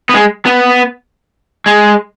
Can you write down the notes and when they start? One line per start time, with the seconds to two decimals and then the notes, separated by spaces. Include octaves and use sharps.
0.09 B3
0.14 G#3
0.46 B3
1.66 G#3